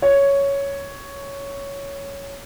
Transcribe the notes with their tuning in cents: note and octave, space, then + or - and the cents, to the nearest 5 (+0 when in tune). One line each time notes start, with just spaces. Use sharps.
C#5 +5